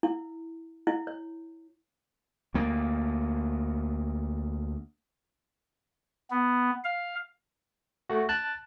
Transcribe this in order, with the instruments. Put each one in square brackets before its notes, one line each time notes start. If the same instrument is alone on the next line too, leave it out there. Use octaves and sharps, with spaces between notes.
[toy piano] E4
E4
C#5
[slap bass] D2 A#3
[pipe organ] B3
F5
[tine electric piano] A3 F#4
A5 F#6